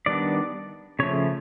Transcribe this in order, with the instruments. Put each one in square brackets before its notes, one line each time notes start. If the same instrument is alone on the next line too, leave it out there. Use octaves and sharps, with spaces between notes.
[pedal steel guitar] D#3 G3 B3 D4 D5
C#3 F3 A3 C#5